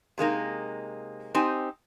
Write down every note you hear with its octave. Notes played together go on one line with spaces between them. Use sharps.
C3 G#3 A#3 D#4
C4 D#4 G4 G#5